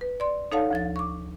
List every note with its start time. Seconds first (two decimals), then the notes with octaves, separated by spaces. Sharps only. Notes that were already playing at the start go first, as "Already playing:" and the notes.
0.01 B4
0.20 D5 C6
0.52 D#4 A4 C#5 F5 F#5 A5
0.71 D2 F3 A6
0.96 C#6 D6